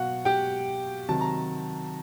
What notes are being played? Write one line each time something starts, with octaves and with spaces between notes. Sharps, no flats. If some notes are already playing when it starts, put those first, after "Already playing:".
Already playing: B2 F#3 F#4 F5 F#5
G4 G5
C3 D#3 F#3 A5
A#5